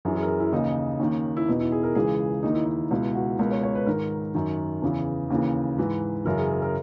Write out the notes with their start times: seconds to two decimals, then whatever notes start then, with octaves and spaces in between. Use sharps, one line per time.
0.05 F#2 E3 G#4
0.17 G#4
0.22 A#4
0.28 G#4
0.40 E4
0.52 D#2 C#3 E3 D#4
1.00 D#2 D#3 C#4
1.37 E4
1.48 E2 B2 D#4
1.60 E4
1.72 G#4
1.83 A#4
1.95 C#2 C#3 E3 G#4
2.43 D#2 D#3 D#4
2.54 E4
2.65 D#4
2.91 C#2 B2 E4
3.15 F#4
3.39 C#2 B2 A#4
3.51 C#5
3.63 C#5
3.75 B4
3.86 G#2 D#3 A#4
4.35 F#2 D#3
4.82 E2 C#3 E3
5.30 D#2 C#3 E3
5.78 G#2 E3 B4
6.25 F#2 C#3 E3 A#4
6.38 G#4
6.50 A#4
6.62 A#4